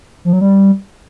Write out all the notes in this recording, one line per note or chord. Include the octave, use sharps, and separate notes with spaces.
F3
F#3
G3